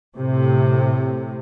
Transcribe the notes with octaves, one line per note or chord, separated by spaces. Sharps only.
A2 C3